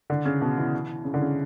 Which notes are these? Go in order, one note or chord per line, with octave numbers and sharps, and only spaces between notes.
D3
C#3
B2
E3
C#3
D3
C#3